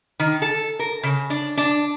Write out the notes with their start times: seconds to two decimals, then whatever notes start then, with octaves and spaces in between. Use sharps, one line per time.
0.20 D#3
0.42 A4
0.79 A#4
1.03 C#3
1.30 D4
1.57 D4